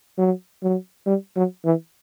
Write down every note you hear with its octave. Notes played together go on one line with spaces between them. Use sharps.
F#3
F#3
G3
F#3
E3